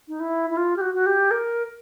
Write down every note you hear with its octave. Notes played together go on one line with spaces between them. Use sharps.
D#4
E4
E4
F4
G4
F#4
F#4
G4
A#4